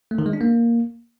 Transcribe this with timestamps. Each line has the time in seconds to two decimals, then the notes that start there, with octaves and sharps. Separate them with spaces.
0.11 A3
0.19 D#3
0.26 G#3
0.33 D4
0.41 A#3